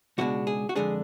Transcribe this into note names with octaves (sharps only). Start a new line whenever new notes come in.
C#2 B2 G#3 D4 F#4
G#4
F#4
F2 D3 G#3 D4 G#4